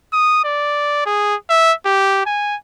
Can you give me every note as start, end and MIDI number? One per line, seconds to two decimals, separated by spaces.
0.13 0.40 87
0.44 1.05 74
1.06 1.35 68
1.50 1.73 76
1.86 2.24 67
2.26 2.56 80